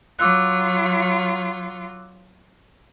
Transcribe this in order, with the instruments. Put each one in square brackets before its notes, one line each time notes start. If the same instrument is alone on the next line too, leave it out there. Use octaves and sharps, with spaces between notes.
[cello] F#3 F4 [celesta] D6 E6 F#6